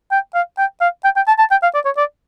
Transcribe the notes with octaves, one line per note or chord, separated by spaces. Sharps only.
G5
F5
G5
F5
G5
G5
A5
A5
G5
F5
D5
C#5
D5